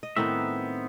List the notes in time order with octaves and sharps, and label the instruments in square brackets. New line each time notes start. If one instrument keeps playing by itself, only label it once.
[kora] D#5
[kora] A2 D#3 D#4 [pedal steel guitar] B3 C4 E5